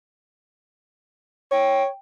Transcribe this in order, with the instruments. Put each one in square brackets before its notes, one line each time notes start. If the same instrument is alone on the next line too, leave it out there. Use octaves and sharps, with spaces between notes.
[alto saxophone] C#5 [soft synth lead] G5